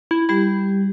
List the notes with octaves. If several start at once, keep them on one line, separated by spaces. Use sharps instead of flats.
E4
G3 E4 G4